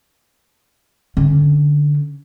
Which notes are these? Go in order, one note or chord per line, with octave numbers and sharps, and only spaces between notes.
D3 C#4